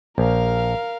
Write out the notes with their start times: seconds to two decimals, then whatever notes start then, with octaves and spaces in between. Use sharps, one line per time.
0.18 A#1 A#4 F5